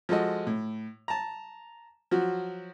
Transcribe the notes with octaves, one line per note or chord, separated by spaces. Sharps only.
F3 G#3 F#4 A4 D#5
A2
A5 A#5
F3 F#3 F#4